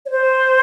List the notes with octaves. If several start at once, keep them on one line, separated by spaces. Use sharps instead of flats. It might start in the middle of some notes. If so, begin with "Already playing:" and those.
C#5
C5